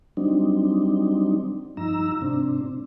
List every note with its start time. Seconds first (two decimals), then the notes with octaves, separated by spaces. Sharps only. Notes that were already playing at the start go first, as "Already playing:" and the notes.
0.17 F#3 G3 C4 D4 D#4
1.77 G2 F3 D#4 A#5 E6
2.22 G#2 C3 C4 D4